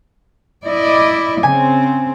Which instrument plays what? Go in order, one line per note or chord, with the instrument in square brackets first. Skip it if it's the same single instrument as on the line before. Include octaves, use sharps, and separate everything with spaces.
[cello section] E4 D5 D#5
[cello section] C#3 C4 [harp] G#5